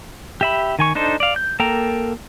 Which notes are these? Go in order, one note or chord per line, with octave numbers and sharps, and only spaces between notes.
G4 E5 B5
D#3 G#5 C#6
D4 D#4 A4 C5
D5 F5
G6
A#3 A4 A#4 G5 A#5